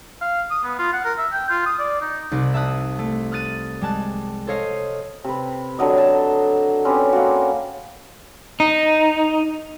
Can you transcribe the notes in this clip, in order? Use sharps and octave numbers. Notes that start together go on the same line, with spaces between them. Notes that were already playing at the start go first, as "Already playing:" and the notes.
F5
D#6
B3
F4
F#5
A#4
E5
G5
F4
D#6
D5
D#4
C2 D#4 D5 F#6
E5 A5 D#6 F#6
A3
D#6 F6 F#6 A6 D#7
G3 G#3 A5 F#6
A4 C5 C#5 D#5 F5
C3 B4
D3 F#3 D#5
A5
C4 C#4 G4 B4
A#3 F#4
D#4